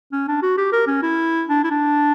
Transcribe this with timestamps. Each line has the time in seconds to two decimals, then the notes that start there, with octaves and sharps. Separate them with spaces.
0.12 C#4
0.28 D4
0.42 F#4
0.57 G4
0.73 A#4
0.87 C#4
1.02 E4
1.49 D4
1.64 E4
1.71 D4